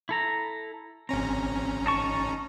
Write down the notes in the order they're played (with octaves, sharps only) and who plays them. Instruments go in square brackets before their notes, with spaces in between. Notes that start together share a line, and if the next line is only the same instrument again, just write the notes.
[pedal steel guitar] E4 A4 A#5
[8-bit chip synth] G#1 C#4 A#5 [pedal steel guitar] C4
[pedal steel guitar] D#4 A5 C#6